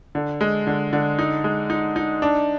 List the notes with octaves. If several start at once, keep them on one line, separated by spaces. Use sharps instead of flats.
D3
G#3
D3
D3
D#4
G#3
D#4
D#4
D4